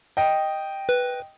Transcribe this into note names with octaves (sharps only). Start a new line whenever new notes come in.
D#5 G5
B4